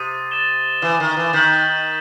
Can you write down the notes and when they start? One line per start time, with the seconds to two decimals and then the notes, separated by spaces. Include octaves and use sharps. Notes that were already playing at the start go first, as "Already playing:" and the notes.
Already playing: C3 D#6 A6 D#7
0.31 A6 E7 G7
0.82 E3
1.00 D#3
1.17 E3
1.33 D#3 G6 B6 F#7